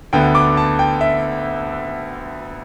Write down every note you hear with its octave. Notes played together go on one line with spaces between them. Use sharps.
D2 D3 B3 G5
D6
A5
G5
E5